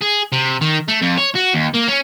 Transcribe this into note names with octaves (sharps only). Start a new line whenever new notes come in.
G#4
C3
D#3
A3
F2
C#5
F#4
D#2
A#3
C#4